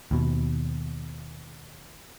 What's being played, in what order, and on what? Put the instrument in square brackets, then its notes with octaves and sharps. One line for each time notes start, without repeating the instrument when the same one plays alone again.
[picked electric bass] D#2 B2